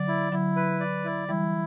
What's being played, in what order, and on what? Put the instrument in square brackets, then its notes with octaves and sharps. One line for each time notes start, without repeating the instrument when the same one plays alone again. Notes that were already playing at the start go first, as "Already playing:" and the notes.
Already playing: [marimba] D3 F#3 [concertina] D5
[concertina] E4
[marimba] D3 F#3 [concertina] E4
[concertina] B4
D5
E4
[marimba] E3 G3 [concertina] E4